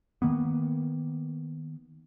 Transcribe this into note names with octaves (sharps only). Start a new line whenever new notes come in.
D#3 A#3 B3